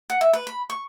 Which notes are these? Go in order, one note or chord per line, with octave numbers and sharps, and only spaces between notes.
F#5
E5
B4
B5
C#6